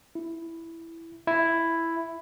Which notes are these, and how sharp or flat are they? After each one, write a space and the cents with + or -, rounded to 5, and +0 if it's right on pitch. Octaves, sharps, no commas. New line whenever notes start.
E4 +5
E4 +5